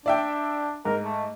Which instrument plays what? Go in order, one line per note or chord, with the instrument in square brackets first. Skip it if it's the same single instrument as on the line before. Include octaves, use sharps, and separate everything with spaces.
[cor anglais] D4 [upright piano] D5 E5 G5
[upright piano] G#2 [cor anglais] A#4
[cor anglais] A3